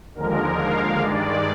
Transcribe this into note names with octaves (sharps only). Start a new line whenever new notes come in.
D#2 D3 F3 G#3 A#4
F5
G2 D#3 G#3 D5